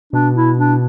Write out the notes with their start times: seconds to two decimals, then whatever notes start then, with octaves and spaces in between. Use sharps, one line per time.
0.13 B2 D4
0.35 E4
0.59 D4